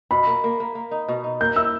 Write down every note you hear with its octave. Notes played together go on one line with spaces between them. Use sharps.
B2 B5
A#3
A#3
A#3
A#3
D#4
B2
D#4
A#3 G6
E4 E6